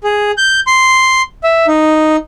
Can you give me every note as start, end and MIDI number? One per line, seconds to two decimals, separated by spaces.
0.04 0.31 68
0.38 0.60 91
0.67 1.22 84
1.44 1.66 76
1.67 2.17 63